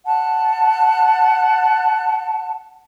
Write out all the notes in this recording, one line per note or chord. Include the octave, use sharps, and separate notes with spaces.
F#5 A5